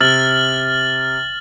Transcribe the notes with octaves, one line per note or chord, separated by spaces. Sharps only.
C3 F6 A6 F#7